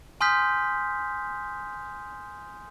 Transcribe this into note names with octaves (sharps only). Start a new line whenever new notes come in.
G#5 C6 D#6 F6 G6 B6